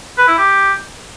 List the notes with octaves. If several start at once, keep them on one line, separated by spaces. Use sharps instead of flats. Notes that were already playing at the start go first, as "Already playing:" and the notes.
B4
E4
G4